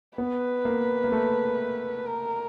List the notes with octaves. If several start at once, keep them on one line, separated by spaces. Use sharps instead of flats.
B3 B4
A#3
A#3
A3
A#4